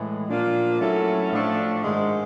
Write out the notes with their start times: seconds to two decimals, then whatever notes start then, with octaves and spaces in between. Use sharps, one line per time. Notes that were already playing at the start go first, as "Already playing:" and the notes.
Already playing: A2 E3 G#3
0.28 A#2 F3 A#3 D4 F4
0.80 F#3 A3 C#4 E4 A4
1.32 A2 F3 A3 D4 F4
1.84 G#2 D#3 G#3